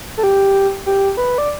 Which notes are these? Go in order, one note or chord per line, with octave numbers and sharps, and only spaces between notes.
A4
G4
G4
B4
D5